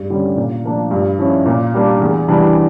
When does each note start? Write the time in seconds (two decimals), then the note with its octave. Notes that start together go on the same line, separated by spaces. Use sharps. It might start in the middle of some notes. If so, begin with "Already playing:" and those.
Already playing: G2
0.10 D3 G3 C#4
0.36 A#2
0.64 F3 A#3 D4
0.91 G2
1.18 F3 C#4 E4
1.46 A#2
1.74 G3 A#3 D4
2.00 E2
2.28 E3 G3 D4